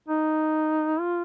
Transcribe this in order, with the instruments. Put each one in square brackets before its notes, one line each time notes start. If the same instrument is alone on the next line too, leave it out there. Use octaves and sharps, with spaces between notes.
[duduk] D#4
F4